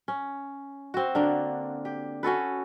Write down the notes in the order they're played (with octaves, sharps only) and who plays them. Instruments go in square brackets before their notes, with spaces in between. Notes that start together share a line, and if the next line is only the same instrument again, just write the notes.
[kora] C#4
C4 F#4
D3 A#3 D4
G4
C#4 F#4 A4 B4